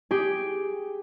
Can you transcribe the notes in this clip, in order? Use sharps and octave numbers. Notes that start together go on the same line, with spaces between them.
G4 G#4